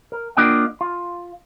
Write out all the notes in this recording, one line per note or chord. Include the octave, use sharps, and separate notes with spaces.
A#4
A#3 D4 F4 D#5 F#5 G5
F4